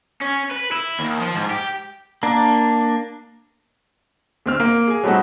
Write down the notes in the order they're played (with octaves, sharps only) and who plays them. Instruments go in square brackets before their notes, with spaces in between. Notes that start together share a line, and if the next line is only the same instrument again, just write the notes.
[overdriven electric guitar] C#4
B4
E4
D#2
F3
G#2
G4
[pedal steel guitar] A#3 D4
[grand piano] D2 C4 F6
A#3
G#4 G#5
F#3 G3 A3 C4 D#4 F#4